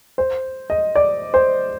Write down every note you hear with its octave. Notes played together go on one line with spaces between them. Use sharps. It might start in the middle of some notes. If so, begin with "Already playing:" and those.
C5
D#5
D5
C5